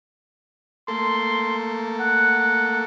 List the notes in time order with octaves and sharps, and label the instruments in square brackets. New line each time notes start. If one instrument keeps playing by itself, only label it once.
[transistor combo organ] A3 A#3 A4 [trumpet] C6
[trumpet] F#5